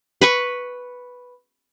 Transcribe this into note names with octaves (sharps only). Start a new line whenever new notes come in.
B4 B5 C#6